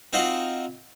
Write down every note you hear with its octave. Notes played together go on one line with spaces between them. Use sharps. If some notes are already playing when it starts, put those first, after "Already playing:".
C4 D#4 F4 F#4